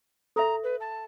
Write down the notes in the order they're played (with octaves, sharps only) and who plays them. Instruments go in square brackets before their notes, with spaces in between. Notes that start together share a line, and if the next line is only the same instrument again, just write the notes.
[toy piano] A4 E5 [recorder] A#5
[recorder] B4
A5